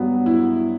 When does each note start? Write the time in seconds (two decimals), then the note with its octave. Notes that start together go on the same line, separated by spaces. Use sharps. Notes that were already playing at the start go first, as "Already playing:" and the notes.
Already playing: G2 F#3 B3 F#4
0.26 E4